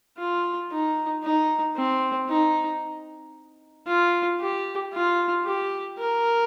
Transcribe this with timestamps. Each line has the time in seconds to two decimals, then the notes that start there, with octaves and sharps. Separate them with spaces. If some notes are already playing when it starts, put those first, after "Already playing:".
0.18 F4
0.71 D#4
1.23 D#4
1.76 C4
2.29 D#4
3.87 F4
4.40 G4
4.93 F4
5.45 G4
5.98 A#4